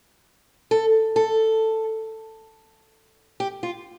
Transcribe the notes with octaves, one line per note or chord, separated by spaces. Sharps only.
A4
A4
G4
F4